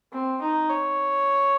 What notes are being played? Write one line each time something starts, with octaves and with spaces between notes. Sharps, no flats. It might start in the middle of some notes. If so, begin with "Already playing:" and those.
C4
D#4
C#5